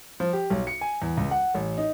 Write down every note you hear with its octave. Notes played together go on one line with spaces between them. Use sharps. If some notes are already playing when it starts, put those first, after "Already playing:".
F3
G4
B1
C#7
G#5
E2
C#2
F#5
A1
D#4